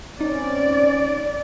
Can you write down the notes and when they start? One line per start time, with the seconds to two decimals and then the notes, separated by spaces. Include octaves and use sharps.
0.21 C4 C#4 D#4 D5